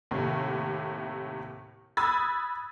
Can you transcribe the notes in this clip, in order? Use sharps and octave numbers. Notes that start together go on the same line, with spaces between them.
D#2 A2 C3
B5 D#6 E6 F#6 G#6 A6